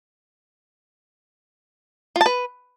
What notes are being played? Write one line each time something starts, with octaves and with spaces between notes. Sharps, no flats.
F4
A5
B4